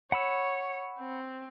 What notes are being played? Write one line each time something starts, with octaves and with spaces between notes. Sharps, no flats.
C#5 F#5 B5 E6
C4